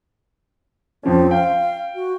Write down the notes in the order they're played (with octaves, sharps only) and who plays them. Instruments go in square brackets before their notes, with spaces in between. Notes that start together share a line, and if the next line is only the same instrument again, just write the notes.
[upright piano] F2 F3 C#4 [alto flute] C4
[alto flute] F5 [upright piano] G5
[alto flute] F#4